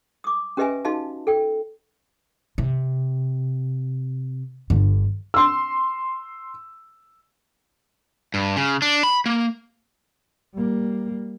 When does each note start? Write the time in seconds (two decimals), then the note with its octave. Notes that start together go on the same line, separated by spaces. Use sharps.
0.24 D6 D#6
0.57 C#4 G4 B4 D#5 E5 G#5
0.85 D#4 F#4 D#5 F5 A5
1.27 A4 G5
2.58 C3
4.70 G1 D3
5.34 C6 E6
8.34 G2
8.56 C#3
8.82 D4
9.03 B5
9.26 A#3
10.54 G3 A#3